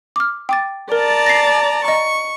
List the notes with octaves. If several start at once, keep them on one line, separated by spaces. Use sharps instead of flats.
D6 F6
G5 D6 A6
A#4 D5 A5 A#5
A#6 C7
D#5 A#5 C#6